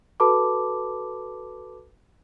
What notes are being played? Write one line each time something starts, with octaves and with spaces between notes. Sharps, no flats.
F#4 A4 B4 A5 B5 D6